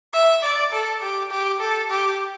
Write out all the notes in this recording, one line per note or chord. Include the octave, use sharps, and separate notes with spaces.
E5
D5
A4
G4
G4
A4
G4